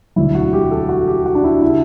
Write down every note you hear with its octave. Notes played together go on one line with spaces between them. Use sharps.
E1 D2 D3 F#3 E4
F#4
G4
A4
F#4
G4
F#4
D4
E4
C#3 E4